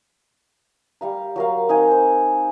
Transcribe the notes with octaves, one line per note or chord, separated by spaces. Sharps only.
G3 F5 A#5
F#3 A#4 F5
C4 D#4 F5 G#5
C5